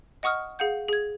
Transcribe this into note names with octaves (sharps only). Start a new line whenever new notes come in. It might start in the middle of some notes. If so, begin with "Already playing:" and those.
D#5 F#5 C#6 D#6 F6
G#4 F5 F#5 G6
G#4 G#6